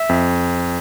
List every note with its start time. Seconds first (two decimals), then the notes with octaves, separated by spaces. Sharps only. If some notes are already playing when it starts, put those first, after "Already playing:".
Already playing: E5
0.09 F2